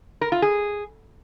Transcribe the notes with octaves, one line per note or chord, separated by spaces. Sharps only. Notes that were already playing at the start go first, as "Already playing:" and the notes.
A#4
F4
G#4